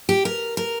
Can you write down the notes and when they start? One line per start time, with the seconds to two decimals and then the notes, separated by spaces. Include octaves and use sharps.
0.09 G4
0.25 A#4
0.57 A#4